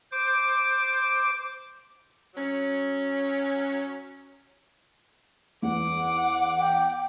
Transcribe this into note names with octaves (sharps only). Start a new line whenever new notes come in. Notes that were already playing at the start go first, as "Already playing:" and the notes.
C5 D6
F#3 C#4
E2 F#5 D6
G5